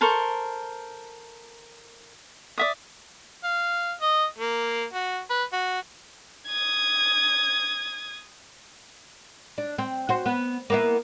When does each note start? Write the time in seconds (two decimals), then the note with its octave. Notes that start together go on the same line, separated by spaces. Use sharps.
0.01 A4 A#4 C5 C#6
2.58 D5 E5 D#6
3.44 F5
4.01 D#5
4.38 A#3
4.93 F#4
5.30 B4
5.53 F#4
6.48 D#6 G#6
9.58 D4
9.78 C4
10.09 F#4 C5
10.26 B3
10.70 A#3 B3 E4